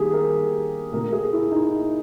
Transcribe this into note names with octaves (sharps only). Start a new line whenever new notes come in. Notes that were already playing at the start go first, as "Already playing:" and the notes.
Already playing: D#3 G3 A#3 G4 G#4
A#4
A#2 A#3 A#4
G#4
E4
D#4
E4